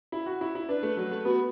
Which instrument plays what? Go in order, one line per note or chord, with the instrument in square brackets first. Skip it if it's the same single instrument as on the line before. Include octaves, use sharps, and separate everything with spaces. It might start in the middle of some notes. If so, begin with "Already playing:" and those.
[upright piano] E4
F#4
E4
E4
[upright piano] D4 [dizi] B4
[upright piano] A3
F#3
A3
[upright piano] B3 [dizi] F#4